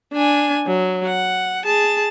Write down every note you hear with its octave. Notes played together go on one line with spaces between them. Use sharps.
D4 G#5
F#3
F#5
G#4 A5